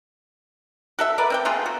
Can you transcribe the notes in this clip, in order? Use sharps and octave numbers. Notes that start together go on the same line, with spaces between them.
F#4 A4 E5
A#4 B4 D5
C4 F#5 G5
A3 B3 F4 G#4
F#4